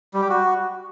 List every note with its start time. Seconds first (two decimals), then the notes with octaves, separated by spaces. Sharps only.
0.14 G3
0.22 G4
0.30 F#4